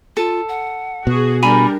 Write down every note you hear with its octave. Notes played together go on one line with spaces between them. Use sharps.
F4 A4
F#5
B2 F#4 G#4
G3 D4 A#4 G#5 A#5 B5